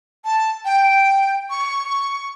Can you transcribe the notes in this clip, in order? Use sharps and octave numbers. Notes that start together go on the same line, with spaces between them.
A5
G5
C#6